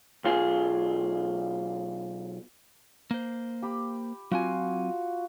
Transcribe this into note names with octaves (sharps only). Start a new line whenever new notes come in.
B1 F4 G#4
A#3 C5
G4 B5
F#3 C4 F4 F#4 G#5